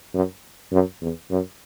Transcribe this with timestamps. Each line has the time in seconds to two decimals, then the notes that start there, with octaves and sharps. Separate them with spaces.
0.14 F#2
0.73 F#2
1.02 E2
1.31 F#2